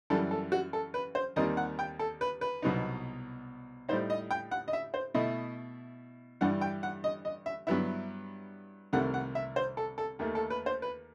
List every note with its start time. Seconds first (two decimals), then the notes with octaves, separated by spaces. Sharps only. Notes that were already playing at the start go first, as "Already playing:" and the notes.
0.10 F#2 E3 G3 A4
0.31 A4
0.52 F#4
0.73 A4
0.94 B4
1.15 C5
1.36 D#2 D#3 G3 C4 D#4 D#5
1.57 F#5
1.79 G5
1.99 A4
2.21 B4
2.41 B4
2.62 C2 B2 F#3 B3 D#4
3.89 A2 G3 D#4 C5
4.10 D#5
4.31 G5
4.51 F#5
4.68 D#5
4.73 E5
4.94 C5
5.14 B2 A3 E4 D#5
6.41 G2 E3 G3 F#5
6.61 G5
6.83 F#5
7.04 D#5
7.25 D#5
7.46 E5
7.67 G2 F#3 B3 E4 E5
8.93 C2 C3 D#3 A3 F#5
9.14 F#5
9.35 E5
9.56 C5
9.77 A4
9.98 A4
10.19 D#2 D#3 A3
10.35 A4
10.50 B4
10.66 C5
10.82 B4